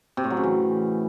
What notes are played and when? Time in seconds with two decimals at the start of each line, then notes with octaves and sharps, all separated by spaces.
0.17 C3
0.24 A2
0.30 F#3
0.37 C#3
0.44 E3